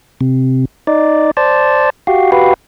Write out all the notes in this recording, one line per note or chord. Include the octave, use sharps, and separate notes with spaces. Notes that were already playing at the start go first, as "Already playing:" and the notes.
C3
D#4 D5
C5 D5 A5
F#4 G4 F5
F#4 G4 B4 F5